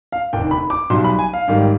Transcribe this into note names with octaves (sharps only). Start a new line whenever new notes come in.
F5
F1 D#2 D3 G5
B5
D6
B1 B2 G3 C6
B5
G#5
F5
G#1 G#2 D#3 G3